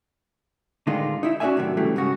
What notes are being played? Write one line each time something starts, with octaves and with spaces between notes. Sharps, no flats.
A2 D3 D#3 G#3 D#4 F4
D#4 E4 E5
C#4 F#4 G#4 D5 E5 G#5
A2 C3 D#3 F#3
F#2 A2 C#3 E3 G3 A3
G#2 C#3 F#4